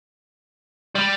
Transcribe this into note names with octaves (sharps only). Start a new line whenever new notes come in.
G3